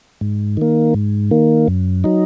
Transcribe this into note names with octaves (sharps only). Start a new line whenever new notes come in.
G#2
D#3 A#3
G#2
D#3 A#3
F#2
F#3 D#4